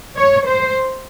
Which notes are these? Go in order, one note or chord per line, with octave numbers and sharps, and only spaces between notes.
C#5
C5